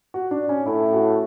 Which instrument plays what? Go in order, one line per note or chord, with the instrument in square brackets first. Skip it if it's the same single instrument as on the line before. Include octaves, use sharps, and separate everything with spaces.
[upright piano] F#4
D4
C#4
[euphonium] A2 [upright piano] E4
[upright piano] F#4